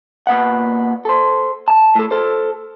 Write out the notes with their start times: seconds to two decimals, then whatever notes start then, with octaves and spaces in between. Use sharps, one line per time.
0.27 A#2 A#3 B3 F#5
1.05 A4 C5
1.68 A5
1.95 A2 A4
2.11 A4 C5